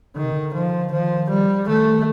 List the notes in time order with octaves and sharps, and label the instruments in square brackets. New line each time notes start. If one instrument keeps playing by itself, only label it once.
[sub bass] D3 [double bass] D#3
[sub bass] C3
D3
[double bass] F3
[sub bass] D#3 [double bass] F3
[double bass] G3
[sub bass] D#3 [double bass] A3